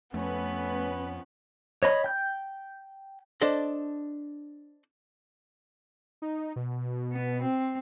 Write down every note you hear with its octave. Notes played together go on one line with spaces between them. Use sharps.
F2 A3 B3 C#4 B4
C#5 D#5 B5
G5 G6
D4 A4 C5 D5 D#5
D#4
B2
B3
C4